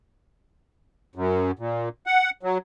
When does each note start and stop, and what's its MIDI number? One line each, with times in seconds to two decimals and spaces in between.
1.16 1.51 42
1.59 1.89 46
2.07 2.30 78
2.43 2.58 54